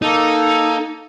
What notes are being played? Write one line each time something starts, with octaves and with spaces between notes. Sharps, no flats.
A#3 D#4 A4